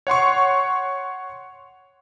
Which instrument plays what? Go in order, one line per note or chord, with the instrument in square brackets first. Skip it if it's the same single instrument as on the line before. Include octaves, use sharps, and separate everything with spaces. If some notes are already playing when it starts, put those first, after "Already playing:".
[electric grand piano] C#5 F#5 C6 C#6